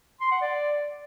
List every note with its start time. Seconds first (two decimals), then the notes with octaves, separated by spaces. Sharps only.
0.21 C6
0.31 F#5
0.42 D5